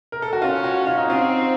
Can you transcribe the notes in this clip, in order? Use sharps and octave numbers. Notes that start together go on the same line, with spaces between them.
A#4
A4
F#4
C#4 F4
F#4
F4
D#4
C4 F4